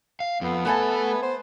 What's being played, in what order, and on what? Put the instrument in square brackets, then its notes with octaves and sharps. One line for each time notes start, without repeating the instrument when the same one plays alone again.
[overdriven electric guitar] F5
[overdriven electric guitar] F2 [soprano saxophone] B3
[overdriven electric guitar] A3 A4 [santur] B4 G#5 A5
[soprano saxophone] C5